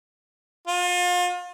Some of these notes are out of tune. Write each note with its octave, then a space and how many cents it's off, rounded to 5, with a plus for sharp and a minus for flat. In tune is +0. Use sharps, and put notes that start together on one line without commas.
F4 +35